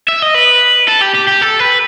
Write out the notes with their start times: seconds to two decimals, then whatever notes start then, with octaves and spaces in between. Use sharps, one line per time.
0.08 E5
0.22 D#5
0.34 B4
0.88 A4
1.02 G4
1.15 G4
1.28 G4
1.42 A4
1.60 B4